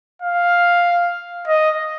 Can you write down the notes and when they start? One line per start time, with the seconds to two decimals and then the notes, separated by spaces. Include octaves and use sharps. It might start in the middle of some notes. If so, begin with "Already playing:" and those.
0.22 F5
1.48 D#5